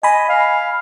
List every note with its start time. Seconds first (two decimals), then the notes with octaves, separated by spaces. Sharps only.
0.03 D#5 G#5 B5
0.29 F5